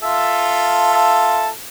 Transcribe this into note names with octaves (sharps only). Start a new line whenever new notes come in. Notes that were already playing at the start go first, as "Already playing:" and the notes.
F4 A4 E5